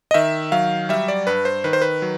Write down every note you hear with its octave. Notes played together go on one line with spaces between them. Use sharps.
D#5
D#3 E5
F#3 F5
G3 E5
D5
G2 B4
C5
D#3 B4
C5
B4
F#3